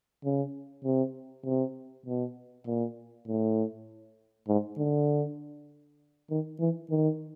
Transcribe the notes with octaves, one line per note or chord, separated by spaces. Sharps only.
C#3
C3
C3
B2
A#2
A2
G#2
D3
D#3
E3
D#3